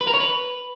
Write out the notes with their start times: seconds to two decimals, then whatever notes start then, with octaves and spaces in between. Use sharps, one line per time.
0.01 B4
0.07 A#4
0.14 C#5
0.20 B4